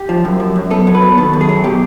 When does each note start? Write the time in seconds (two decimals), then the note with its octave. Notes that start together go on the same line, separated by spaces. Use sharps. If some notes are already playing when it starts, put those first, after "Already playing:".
Already playing: G4
0.09 F3
0.25 F#2
0.40 F#2
0.56 F#2
0.71 B3 A4
0.87 F#3
0.95 B4
1.02 B3
1.18 D#3 A4
1.33 F#2
1.41 G#4
1.49 F#3
1.64 B2 G4